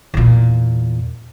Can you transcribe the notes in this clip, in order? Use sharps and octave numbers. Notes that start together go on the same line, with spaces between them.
E2 A#2